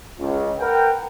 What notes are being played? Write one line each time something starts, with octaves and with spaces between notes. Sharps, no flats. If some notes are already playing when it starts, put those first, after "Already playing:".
C#2
A#4 B4 F#5 G5